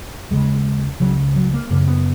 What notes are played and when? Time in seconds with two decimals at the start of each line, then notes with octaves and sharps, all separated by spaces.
0.31 D#2 C#3 G#3
1.00 C#2 C#3 F#3
1.36 F#3
1.54 A#3
1.70 F#2 C#3 A#3
1.81 C#4
1.87 B3